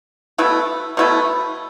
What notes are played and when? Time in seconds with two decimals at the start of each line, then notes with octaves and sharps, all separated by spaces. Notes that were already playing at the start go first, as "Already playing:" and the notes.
0.38 B2 A3 E4 B4
0.97 B2 A3 E4 B4